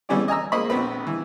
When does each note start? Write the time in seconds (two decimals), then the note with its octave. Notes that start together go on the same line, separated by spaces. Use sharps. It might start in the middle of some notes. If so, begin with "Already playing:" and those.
0.09 E3 G3 B3 C#4 G#4 D5
0.28 D#5 G#5 A#5 E6
0.52 G#3 A#3 C5 D#5 B5
0.70 A#1 B3 C4 B4
1.07 E3